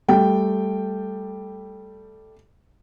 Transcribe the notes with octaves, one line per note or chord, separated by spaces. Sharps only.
G3 A3 G5